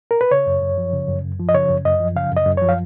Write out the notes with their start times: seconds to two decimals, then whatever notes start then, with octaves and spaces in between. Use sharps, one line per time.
0.11 A#4
0.21 B4
0.31 C#3 C#5
0.46 F#2
0.62 F#2
0.78 F3
0.93 C#3
1.08 F#2
1.24 F#2
1.39 F3
1.49 D#5
1.54 C#3 C#5
1.69 F#2
1.85 F#2 D#5
2.00 F3
2.16 C#3 F5
2.31 F#2
2.36 D#5
2.46 F#2
2.57 F3 C#5
2.69 F5